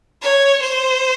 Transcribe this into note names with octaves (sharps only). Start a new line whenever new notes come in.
C#5
C5